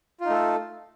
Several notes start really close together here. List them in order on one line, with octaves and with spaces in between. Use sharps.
F4 D#4 A3 A4